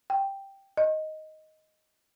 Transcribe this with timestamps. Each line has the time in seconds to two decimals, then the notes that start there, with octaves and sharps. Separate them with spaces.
0.10 G5
0.77 D#5